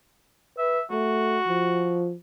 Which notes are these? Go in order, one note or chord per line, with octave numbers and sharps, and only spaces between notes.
B4 E5
A3 F#4
F3